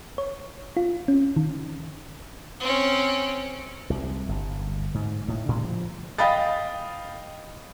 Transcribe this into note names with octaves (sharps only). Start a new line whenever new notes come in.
C#5
F4
C#4
D#3
C4 C#4
C2
G1
G#2
A2
A2 D3 D#3 G3
F3
D#5 F5 G5 B5 D#6 A6